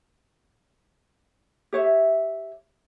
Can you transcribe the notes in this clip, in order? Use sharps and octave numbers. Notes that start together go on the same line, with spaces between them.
G4 C#5 E5